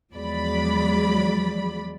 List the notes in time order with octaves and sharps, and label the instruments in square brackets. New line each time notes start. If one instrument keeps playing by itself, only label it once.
[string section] E2 F3 F#3 G#3 D5 B5